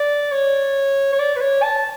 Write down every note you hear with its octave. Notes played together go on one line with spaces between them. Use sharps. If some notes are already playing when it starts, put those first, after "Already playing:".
Already playing: D5
C#5
C#5
D5
B4
C#5
A5